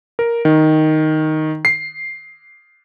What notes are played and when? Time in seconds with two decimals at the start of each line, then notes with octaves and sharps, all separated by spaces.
0.19 A#4
0.45 D#3
1.65 C7